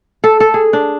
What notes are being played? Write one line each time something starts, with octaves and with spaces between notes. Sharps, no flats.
A4
A4
G#4
D4